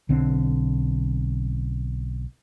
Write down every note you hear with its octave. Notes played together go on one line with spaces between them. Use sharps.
B1 D3 C4